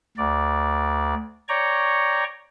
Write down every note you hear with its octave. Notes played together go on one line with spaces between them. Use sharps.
D2 D5
C#5 D5 G5 A#5 C#6